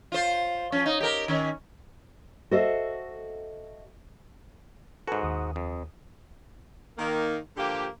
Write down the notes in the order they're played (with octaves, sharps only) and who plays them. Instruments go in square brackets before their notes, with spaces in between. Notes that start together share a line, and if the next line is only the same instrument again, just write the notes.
[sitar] F4 C5
F3 C#4
D#4
G4 A#4
D#3 C#4
[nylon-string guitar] F#4 A4 C5 D#5 E5
[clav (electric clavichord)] G#2 F#4 [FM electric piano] A4 B4 G#5
[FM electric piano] D#2 D#6
[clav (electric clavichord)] F2
[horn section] D#3 A#3
D3 F3 A#3 G4